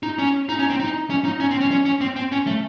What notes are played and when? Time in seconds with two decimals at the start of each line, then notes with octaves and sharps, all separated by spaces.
0.03 D#4
0.19 C#4
0.49 D#4
0.59 C#4
0.70 C4
0.80 D#4
1.10 C#4
1.25 D#4
1.40 C#4
1.51 C4
1.60 C#4
1.71 C#4
1.86 C#4
2.01 C4
2.16 C4
2.32 C#4
2.47 A3